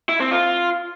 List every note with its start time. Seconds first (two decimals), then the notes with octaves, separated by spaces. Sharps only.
0.09 E4
0.20 C4
0.31 F4